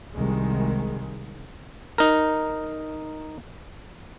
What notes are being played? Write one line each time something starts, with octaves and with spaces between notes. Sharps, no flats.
C2 D#3 G#3
D#4 A#4